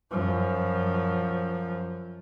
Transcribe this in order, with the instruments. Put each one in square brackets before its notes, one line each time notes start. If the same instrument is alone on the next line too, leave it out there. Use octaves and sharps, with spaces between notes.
[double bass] F#2 F3